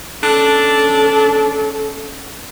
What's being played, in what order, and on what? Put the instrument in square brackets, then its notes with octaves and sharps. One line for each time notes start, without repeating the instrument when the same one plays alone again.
[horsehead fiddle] C#4 A4 [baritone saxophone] D4